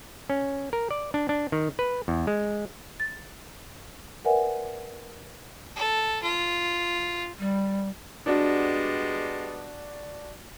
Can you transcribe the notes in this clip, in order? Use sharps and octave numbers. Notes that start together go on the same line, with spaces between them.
C#4
A#4
D5
D4
D4
D#3
B4
E2
G#3
A6
A#4 B4 D5 E5 F#5 G#5
A4
F4
G3
G3 G#3 B3 D4 F#4 D5